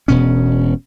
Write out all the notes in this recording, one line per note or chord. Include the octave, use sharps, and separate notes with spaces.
E1 B2 C#4